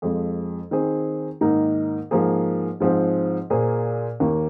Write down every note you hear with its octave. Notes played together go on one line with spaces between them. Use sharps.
F2 F3 G#3
D#3 C4 G#4
G#2 D#3 A#3 D#4 A#4
G#2 F3 A#3 G#4
G#2 F3 C4 G#4
A#2 A#3 G#4 C5
D#2 D#3 A#3